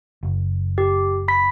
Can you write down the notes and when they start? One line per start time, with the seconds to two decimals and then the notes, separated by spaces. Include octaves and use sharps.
0.23 F#1
0.78 G4
1.28 B5 B6